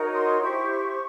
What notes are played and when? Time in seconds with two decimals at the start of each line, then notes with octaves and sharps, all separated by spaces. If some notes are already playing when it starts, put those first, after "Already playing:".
Already playing: D#4 F#4 A#4 C#5
0.13 C6
0.41 E4 G4 C5 C#6